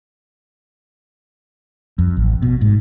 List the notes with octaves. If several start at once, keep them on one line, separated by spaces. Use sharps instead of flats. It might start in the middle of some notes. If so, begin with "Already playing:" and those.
F2
A1
B2
G#2